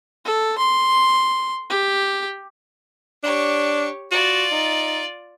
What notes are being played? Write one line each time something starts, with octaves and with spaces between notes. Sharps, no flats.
A4
C6
G4
D4 G4 C#5
F4 F#4 D5
D#4